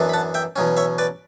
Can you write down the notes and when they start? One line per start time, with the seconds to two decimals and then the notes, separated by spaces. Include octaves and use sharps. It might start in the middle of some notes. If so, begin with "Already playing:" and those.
Already playing: F#2 E3 B3 D4
0.09 B5
0.14 F#5 A5
0.34 E5 G5
0.56 E2 B2 F#3 C#4
0.77 C#5 E5
0.98 B4 D5